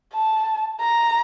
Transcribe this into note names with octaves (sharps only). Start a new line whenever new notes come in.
A5
A#5